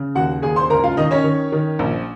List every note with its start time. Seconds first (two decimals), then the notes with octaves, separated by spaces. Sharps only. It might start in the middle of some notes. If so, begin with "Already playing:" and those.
Already playing: C#3
0.15 D#2 F#4 F#5
0.42 D#2 G#4 G#5
0.56 C5 C6
0.70 C#2 A#4 A#5
0.84 F4 F5
0.97 D#3 D#4 D#5
1.11 C#4 C#5
1.24 D#3
1.52 D#3
1.79 A#1